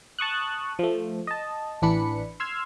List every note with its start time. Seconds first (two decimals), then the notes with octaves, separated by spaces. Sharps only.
0.19 A5 C#6 D#6 F#6
0.79 F3 A3
1.27 D#5 A5
1.82 A1 E3 D4 B4 B5 C#7
2.40 C6 E6 F6 G#6